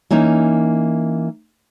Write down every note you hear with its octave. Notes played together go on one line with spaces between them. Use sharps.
E3 A#3 C#4 D#4